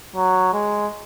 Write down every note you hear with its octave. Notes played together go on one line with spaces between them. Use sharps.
F#3
G#3